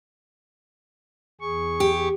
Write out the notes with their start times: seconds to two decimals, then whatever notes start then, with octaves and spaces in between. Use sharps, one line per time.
1.41 E2 G#4 C#6
1.80 G4